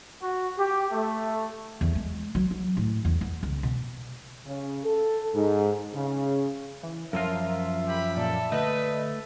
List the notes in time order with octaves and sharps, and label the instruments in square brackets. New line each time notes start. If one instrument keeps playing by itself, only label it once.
[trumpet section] F#4
G4
A3
[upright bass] E2
G#3
F#3
F#3
A2
E2
B3
C#2
B2
[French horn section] C#3
A4
G#2
C#3
[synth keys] E3
[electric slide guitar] F#2 F3 F4 [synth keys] A#4 [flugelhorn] E5
[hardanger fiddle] G4 B5
[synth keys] A#2 D5 [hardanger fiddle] A4
[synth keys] D3 D#5 [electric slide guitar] A3 [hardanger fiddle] B4